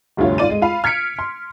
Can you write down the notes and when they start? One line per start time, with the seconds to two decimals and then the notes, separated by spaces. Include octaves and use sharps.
0.17 F1 D2 G2 F4 C#5
0.38 G#2 F4 D5 D#7
0.50 G#3
0.62 F4 F5 B5
0.84 F6 G#6 B6 C#7 D7
1.19 C6